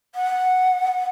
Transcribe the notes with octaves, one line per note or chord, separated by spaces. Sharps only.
F#5